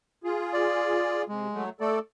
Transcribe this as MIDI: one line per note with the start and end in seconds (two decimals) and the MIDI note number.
0.24 1.24 65
0.24 1.24 68
0.53 1.22 74
1.28 1.47 48
1.28 1.64 56
1.53 1.69 54
1.53 1.69 57
1.80 1.99 57
1.80 1.99 69
1.80 1.99 74